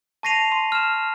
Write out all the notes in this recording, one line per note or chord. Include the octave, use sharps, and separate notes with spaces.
A5 C#6 A#6 C7 D#7 F7
C6
F6 E7